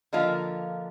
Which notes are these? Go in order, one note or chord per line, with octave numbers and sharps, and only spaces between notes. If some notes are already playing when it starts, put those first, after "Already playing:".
D3 F3 A#3 F4 A#4 D#5